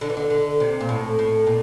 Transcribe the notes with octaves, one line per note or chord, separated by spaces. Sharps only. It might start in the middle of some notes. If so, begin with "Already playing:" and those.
D3
E3
D3
D3
C3
A#2
A2
A2
A#2